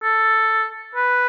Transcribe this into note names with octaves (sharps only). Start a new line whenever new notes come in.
A4
B4